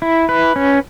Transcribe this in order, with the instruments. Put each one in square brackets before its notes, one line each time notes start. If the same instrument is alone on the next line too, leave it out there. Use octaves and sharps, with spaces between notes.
[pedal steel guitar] E4
B4
C#4